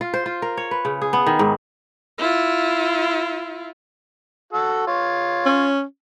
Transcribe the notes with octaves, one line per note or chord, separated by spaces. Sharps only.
F4
C5
F4
A#4
C#5
B4
C#3
G#4
B3
D#3
G#2
E4 F4
F#4 A4 E6
F4 C#5
C#4